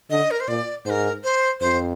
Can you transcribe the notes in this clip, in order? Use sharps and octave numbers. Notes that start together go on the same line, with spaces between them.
D3 D#5
A#4
C5
A#2 D5
G#2 A#4 C5
C5
F2 C5